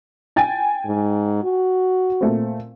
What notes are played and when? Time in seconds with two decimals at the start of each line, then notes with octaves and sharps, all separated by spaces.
0.36 G5 G#5 A6
0.85 G#2
1.43 F#4
2.21 A#2 A3 C4